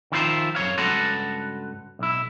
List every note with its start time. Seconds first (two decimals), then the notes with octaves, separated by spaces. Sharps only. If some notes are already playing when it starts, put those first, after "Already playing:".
0.12 D#3 F3 E4 F4 B4 C5
0.55 F#2 D#3 C#5 F5
0.78 C#2 G2 F#4 A4 B4 C6
1.99 B1 E4